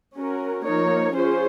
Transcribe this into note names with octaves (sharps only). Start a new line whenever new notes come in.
C#4 F#4 A#4
F3 A#3 D#4 A#4 C#5
C#4 F4 G#4 C5